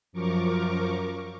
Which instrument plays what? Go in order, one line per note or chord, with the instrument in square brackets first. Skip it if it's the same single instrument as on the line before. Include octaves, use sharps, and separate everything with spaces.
[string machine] F#2 F3 A#4 C#6 D6